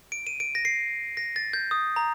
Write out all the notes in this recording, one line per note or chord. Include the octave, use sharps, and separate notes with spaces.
D7
D#7
D7
A#6
C7
A#6
A6
G6
D#6
A#5